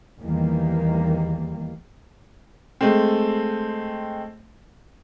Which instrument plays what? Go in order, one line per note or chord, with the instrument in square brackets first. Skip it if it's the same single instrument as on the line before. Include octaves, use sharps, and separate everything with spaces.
[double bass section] E2 D#3 G3 A#3
[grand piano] G#3 A3 C4